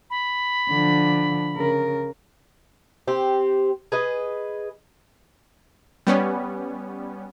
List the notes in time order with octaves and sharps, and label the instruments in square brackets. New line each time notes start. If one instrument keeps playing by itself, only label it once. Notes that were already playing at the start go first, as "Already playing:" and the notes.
[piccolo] B5
[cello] D3 F3
C#3 A#4
[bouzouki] C4 G4
G#4 B4 D#5
[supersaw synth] G3 B3 C#4